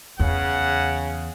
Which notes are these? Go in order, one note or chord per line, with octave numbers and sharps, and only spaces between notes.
E2 C#3 F#5